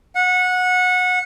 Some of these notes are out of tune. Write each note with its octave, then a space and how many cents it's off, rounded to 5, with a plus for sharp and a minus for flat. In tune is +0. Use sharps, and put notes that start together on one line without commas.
F#5 -20